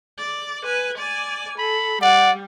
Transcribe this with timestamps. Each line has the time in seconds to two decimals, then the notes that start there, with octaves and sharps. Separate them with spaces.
0.18 D5
0.64 B4 G#5
0.98 D5 G#5
1.58 A4 B5
2.02 G3 D5 F#5